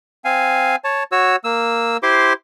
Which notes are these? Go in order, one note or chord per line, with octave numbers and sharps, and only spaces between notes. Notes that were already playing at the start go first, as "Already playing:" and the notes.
C4 F5 G#5
C#5 A5
F#4 C#5 E6
A#3 E6
E4 G4 C5 C6 D6